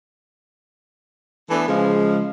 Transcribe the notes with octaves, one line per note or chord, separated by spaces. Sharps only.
E3 A3 B3 D4 A4
C#3 F3 G#3